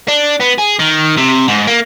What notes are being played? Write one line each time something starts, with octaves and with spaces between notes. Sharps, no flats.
D4
B3
G#4
D#3
C3
G#2
A#3